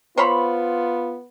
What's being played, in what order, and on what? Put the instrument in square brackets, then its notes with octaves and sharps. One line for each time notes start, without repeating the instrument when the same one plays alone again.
[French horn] B3 [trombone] F4 [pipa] C5 C#5 B5